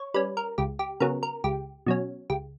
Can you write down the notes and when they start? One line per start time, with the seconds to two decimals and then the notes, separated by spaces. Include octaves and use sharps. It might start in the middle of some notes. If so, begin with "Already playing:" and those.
Already playing: C#5
0.14 G3 C#4 B4
0.37 A#4
0.58 C#2 G4
0.79 G4
1.00 C#3 F#3 B3 A#4
1.23 A#4
1.44 C#2 G4
1.87 B2 F#3 C#4
2.30 C#2 G4